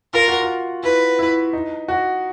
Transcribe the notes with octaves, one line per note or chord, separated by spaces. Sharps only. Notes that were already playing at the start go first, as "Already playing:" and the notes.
F4 A#4
F#4
F4
E4 B4
E4
D#4
F#4